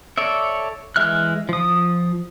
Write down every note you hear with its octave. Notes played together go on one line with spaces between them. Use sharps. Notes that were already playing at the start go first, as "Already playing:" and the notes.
A4 C#5 D5 E5
E3 G#3 E5 F6 F#6
F3 D#6